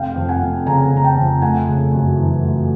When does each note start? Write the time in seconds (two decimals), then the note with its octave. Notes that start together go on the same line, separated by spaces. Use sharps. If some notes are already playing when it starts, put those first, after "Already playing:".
Already playing: F1 F5 G5
0.16 F2
0.29 F#5 G#5
0.41 F1
0.66 C#3 G#5 A#5
0.92 F1 A#5
1.04 G5 A5
1.17 F2
1.42 A3 F#5 G#5
1.67 C#3
1.92 F#2
2.18 E3
2.43 A3